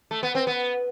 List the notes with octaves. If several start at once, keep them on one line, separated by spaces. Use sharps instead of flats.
A3
B3
C4
B3